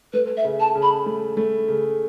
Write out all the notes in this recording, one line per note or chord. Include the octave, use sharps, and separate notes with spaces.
A3 B4
E5
C#3
A5
C#3
B5
A3
A3
C#3